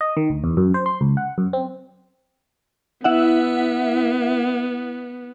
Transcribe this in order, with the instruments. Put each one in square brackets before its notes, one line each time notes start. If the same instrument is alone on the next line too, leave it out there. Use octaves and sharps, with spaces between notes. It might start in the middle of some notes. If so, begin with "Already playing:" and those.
[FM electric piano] D#5
D#3
D2
E2
F#2
C5
C6
C#2
F#5
F#2
C4
[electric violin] B3 [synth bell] E4 E5 F#5